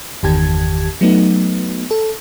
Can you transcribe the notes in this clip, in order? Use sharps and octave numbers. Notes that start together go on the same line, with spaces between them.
G1 E2 D#3 G4 A5 G#6
F#3 A3 B3 D#4
A4